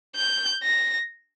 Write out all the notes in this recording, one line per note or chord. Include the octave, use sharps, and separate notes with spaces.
G6
A#6